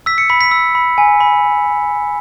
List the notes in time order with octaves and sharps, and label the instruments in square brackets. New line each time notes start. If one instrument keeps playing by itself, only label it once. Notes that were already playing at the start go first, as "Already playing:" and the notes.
[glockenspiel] E6 B6
C#7
B5 B6
B6
E6
B5
G#5
B5